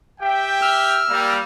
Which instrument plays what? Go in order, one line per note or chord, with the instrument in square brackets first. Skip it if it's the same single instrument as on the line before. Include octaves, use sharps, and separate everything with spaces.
[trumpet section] G4 E5 G5
[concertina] E6 F6
[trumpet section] G3 A#3